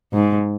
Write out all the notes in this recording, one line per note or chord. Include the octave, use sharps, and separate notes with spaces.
G#2